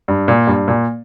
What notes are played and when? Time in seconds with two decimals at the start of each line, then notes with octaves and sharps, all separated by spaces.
0.08 G2
0.28 A#2
0.47 G2
0.68 A#2